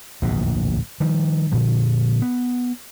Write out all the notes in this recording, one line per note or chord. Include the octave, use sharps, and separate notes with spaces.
D1 A#1 E2 B2
D#3 F3 G3
A#2 D3 F3
B3